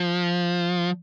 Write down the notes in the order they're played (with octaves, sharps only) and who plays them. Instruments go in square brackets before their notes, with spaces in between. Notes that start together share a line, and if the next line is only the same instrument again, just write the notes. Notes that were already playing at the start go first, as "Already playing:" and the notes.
Already playing: [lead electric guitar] F3